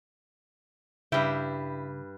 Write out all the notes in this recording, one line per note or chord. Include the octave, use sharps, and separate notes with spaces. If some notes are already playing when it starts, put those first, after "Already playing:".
G2 C#3 E4 D5 G5